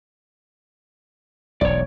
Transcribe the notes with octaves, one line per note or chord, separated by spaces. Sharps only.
E1 B1 C#5 D5